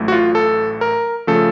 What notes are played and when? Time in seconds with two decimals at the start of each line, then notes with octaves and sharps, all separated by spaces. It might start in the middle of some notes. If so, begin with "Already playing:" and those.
Already playing: A1 A2 F#3 A3
0.08 F#4
0.12 F4
0.35 A4
0.81 A#4
1.27 C#3 F3 A3 A4